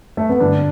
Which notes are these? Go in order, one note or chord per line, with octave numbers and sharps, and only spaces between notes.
A3
B3
G2 D3 D4